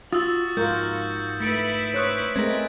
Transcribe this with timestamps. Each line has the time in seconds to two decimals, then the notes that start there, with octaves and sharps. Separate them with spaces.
0.12 F4 F#4 D#6 E6 A6
0.57 G#2 F4 A#4 G6
1.40 A3 E4 B4 A6 C#7 D7
1.94 C5 C#5 D#6 F#6 C#7
2.36 G#3 A3 C4 A#4 G#6 A#6